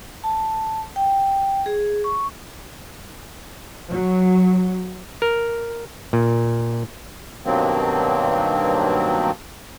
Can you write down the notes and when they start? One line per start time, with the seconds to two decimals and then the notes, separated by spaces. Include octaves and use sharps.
0.24 A5
0.96 G5
1.66 G#4
2.04 C#6
3.90 F#3
5.22 A#4
6.13 A#2
7.46 G2 B2 D#3 F#3 A#3 C4